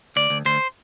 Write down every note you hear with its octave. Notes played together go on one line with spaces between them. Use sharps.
D2 D5
D2
D2 C5